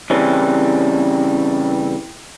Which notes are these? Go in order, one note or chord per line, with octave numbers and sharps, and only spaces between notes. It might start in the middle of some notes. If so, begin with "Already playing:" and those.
C#3 E3 G3 C4 C#4